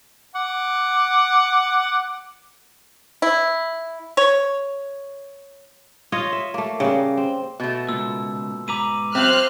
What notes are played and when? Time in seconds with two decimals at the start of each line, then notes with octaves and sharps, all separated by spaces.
0.35 F#5 D6
3.22 E4
4.17 C#5
6.12 F4 C#5 D#5
6.32 E5
6.54 A3 A#3
6.80 C#3 G3 A#3
7.17 C4
7.60 B2 A3
7.89 C#2 A#2 E6
8.68 G#2 B4 A#5 D6 D#7
9.15 F#3 C4 C5 E5 F5 F6 F#6